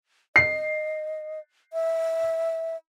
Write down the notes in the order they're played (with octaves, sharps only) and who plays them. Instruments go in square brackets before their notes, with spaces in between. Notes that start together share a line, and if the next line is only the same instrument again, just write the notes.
[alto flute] D#5 [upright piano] C7
[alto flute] E5